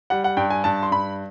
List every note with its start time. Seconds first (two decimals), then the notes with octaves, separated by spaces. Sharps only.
0.10 G3 F#5
0.24 F#5
0.37 G2 G5
0.50 G#5
0.64 G2 A5
0.83 C6
0.91 G2 B5